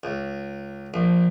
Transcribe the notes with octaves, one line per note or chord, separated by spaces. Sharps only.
C#2
A#1